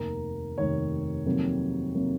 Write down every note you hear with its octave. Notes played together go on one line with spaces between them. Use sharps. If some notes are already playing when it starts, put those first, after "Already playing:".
Already playing: F1 D#2 D#3 A#3 A#4
F1 D#2 D#3 A#3 C#5
F2 C3 D#3 F#3 A#3
C3 D#3 F#3 A#3